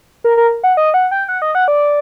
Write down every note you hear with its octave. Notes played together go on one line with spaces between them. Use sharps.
A#4
A#4
F#5
D#5
F#5
G5
F#5
D#5
F#5
D5